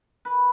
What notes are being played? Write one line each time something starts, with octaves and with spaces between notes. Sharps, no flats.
B4